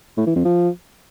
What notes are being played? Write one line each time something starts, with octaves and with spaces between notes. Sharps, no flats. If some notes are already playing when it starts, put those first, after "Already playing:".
A2
E3
F2
F3